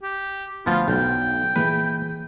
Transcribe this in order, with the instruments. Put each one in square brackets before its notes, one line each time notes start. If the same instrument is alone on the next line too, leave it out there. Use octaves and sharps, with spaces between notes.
[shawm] G4
[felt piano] D2 [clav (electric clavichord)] F3 B3 [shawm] F4
[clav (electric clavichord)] B1 [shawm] G5
[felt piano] A#2 E3 G#4 [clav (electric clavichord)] B4